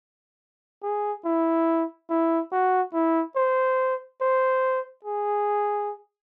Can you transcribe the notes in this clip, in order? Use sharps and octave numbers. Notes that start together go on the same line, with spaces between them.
G#4
E4
E4
F#4
E4
C5
C5
G#4